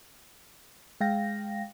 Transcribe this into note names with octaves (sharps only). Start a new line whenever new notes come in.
G#3 F5 G5 A#6